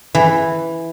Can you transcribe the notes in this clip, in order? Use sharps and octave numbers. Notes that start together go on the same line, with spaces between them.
E3